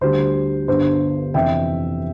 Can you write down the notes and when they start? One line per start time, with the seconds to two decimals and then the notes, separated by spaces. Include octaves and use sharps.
0.01 D2 D3 G3 C5
0.68 G1 G2 D3 C5
1.34 F2 C3 E3 E5 G5